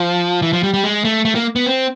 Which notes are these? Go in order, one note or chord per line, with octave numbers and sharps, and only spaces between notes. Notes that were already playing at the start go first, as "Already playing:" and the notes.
Already playing: F3
E3
F3
G3
G3
G#3
A3
A3
A#3
B3
C4